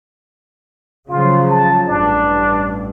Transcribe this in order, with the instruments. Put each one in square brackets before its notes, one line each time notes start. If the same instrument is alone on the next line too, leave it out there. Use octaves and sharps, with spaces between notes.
[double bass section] C#3 F3 F#3 [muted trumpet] F4
[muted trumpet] A5
[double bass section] A1 G2 [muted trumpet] D4